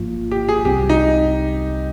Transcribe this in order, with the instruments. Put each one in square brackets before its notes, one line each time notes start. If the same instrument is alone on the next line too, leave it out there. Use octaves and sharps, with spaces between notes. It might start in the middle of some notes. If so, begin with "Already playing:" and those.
Already playing: [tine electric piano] G#1 G#2 F3 A#3 F4
[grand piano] G4
G#4
[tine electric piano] C2 C3 G3 C4 [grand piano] G4
[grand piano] D#4